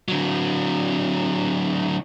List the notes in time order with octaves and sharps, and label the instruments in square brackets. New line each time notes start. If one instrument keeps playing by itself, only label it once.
[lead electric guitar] D3 F#3